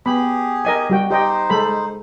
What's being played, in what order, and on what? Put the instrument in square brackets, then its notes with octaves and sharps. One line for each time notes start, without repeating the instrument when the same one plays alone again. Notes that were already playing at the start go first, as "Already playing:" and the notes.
[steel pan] B3 B5 [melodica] G4 G#4
[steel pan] A#4 D#5 G#5
G3 F#4 G5
[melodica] D#4 C5 [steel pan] G4 D#5 G5
[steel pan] G#3 A4 B5